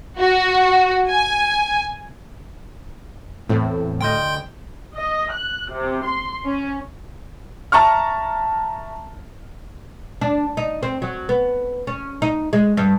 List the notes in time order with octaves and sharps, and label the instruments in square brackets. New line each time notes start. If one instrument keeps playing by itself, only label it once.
[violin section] F#4
G#5
[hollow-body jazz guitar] E2 C4 [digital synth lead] A2
[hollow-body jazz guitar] D2 D#5 [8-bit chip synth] G5 C6 G6
[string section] D#5
F#6
C3
C6
C#4
[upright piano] E5 A5 A#5 C#6 F6
[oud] D4
D#4
C4
F#3
B3
C#4
D#4
G#3
G2